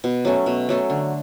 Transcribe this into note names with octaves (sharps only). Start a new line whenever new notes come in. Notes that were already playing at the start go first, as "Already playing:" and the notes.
B2
F#3 A3 C#4
B2
F#3 A3 C#4
D3